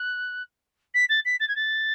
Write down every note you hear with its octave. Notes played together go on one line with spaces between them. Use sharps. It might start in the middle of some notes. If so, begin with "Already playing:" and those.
Already playing: F#6
B6
A6
B6
A6
G#6
A6